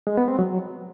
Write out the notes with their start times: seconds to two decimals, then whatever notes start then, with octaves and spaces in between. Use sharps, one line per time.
0.07 G#3
0.17 B3
0.28 C4
0.39 F#3